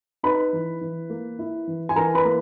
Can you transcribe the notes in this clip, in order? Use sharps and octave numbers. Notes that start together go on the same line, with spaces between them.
D#4 B4 B5
E3
E3
A#3
E4
E3
G#5
E3 A#4 A#5
B4 B5
A#3